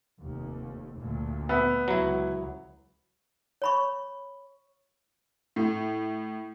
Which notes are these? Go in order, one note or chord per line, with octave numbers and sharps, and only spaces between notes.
F1 D#2
D2 A#2
B3 E5
C#2 F#3 E4
C#5 B5 C#6
A2